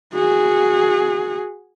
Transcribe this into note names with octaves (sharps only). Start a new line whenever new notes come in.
F#4 G#4